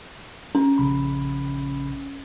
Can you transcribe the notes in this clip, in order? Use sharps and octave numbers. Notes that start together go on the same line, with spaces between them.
C#4
A#1 C#3 B5